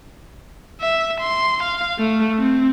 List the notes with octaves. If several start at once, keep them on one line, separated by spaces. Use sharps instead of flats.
E5
C6
F5
A3
C4